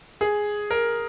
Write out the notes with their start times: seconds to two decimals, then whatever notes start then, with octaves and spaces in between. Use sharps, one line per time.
0.21 G#4
0.71 A#4